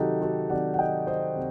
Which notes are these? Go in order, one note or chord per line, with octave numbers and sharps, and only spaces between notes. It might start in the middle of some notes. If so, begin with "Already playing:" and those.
Already playing: C3 D#3 F#3 D#4 F#4 G4 A4
F#4 A4
C3 D#3 F#3 D5 F#5
F#5
D#5 G5
C5 D#5
C3